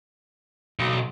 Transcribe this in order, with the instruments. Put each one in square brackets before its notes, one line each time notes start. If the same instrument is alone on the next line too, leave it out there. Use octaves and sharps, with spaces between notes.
[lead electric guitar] B1